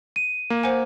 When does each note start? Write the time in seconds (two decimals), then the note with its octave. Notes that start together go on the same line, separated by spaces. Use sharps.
0.16 D#7
0.50 A#3
0.63 C5 F#5 G#5